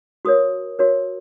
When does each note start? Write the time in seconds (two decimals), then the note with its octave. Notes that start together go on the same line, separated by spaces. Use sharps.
0.25 F#4 A#4 C#5 D#6
0.79 F#4 A#4 C#5